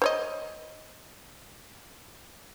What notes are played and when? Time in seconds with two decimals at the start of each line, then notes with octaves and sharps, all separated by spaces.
0.02 C5 C#5 D#5